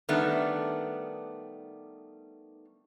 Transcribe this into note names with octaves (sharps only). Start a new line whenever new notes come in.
D#3 G3 A3 B3 D4